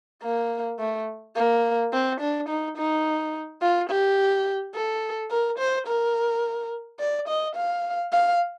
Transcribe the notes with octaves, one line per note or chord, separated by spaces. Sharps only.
A#3
A3
A#3
C4
D4
D#4
D#4
F4
G4
A4
A#4
C5
A#4
D5
D#5
F5
F5